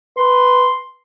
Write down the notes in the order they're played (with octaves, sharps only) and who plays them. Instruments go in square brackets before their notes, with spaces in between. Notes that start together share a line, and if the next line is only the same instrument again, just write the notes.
[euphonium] B4 [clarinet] C6